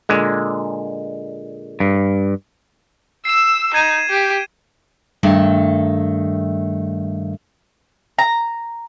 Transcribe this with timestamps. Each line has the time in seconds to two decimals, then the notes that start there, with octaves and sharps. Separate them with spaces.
0.09 A#2 D3 G#3
1.80 G2
3.25 E6 C7 E7
3.74 D#4 G#6 D#7 E7
4.10 G4
5.23 G2 D#3 A3
8.19 A#5